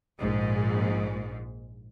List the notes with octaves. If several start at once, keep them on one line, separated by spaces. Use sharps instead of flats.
A#1 G#2